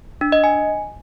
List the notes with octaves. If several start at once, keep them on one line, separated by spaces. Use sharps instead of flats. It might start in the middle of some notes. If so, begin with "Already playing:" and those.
D4
D#5
G#5